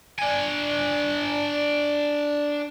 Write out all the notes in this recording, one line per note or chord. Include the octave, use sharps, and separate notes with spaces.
D4 G#5